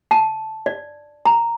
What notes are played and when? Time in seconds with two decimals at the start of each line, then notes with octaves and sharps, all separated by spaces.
0.11 A5
0.66 D5
1.25 A#5